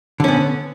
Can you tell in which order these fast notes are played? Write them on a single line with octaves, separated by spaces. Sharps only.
D3 C#4 B3